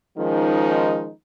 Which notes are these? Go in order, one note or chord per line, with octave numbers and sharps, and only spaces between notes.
D#3 F3 G#3 C#4 D#4